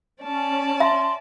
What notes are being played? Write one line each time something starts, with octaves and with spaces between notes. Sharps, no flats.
C#4 D5 A5
E5 C6